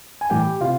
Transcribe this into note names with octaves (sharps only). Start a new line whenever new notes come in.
G#5
A2 E3 G3 G4 G5
C3 F4 F5